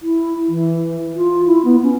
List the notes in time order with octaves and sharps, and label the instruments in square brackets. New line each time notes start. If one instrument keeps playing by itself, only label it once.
[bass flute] E4
E3
F4
E4
B3
C#4